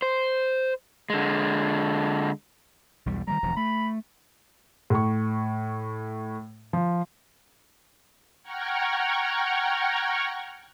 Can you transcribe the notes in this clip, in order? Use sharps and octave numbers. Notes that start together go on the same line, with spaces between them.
C5
D3 G#3
B1 E2 G3
D#3 F3 G3 A#5
E1 D2 F3
A3 B5
A2 C#6
F3
F#5 G5 A#5 C#6 F6 G#6